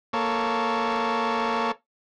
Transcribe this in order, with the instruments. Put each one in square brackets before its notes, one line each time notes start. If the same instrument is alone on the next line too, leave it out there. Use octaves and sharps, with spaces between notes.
[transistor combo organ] A#3 A4 C#5